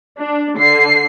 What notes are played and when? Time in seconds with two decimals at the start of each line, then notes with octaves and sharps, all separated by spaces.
0.19 D4
0.59 D3 C7